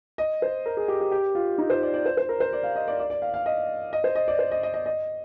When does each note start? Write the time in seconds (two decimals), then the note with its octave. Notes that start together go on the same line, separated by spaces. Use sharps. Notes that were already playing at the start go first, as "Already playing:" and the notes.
0.18 D#5
0.42 C5
0.66 A#4
0.77 G#4
0.88 G4
1.01 G4
1.11 G4
1.35 F4
1.58 D#4
1.70 C5
1.83 D5
1.94 D5
2.06 C5
2.17 C5
2.29 A#4
2.40 C5
2.53 D5
2.63 F5
2.76 D#5
2.88 D5
2.99 D5
3.10 D5
3.22 F5
3.34 F5
3.46 D#5
3.93 D#5
4.04 C5
4.15 D#5
4.28 D5
4.39 C5
4.52 D#5
4.63 D#5
4.74 D#5
4.86 D#5